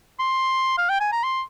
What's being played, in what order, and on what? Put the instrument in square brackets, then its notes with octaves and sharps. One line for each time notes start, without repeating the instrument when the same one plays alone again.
[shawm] C6
F5
G5
G#5
A#5
C6